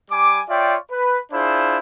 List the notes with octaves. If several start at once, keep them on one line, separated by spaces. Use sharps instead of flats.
G3 G#5 D6
F4 C#5 D5 E5 G5
B4
D4 E4 F4 G#4 C5